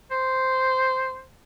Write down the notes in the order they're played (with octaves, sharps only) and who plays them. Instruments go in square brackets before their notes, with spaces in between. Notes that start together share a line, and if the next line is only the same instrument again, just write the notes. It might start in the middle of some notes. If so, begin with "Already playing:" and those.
[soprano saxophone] C5